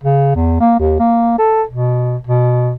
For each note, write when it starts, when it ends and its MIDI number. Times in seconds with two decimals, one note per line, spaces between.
0.03 0.35 49
0.35 0.58 40
0.60 0.77 58
0.79 0.97 39
1.00 1.35 58
1.38 1.63 69
1.68 2.17 47
2.27 2.74 47